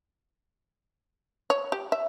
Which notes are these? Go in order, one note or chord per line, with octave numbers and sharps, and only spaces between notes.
C#5
G4
E5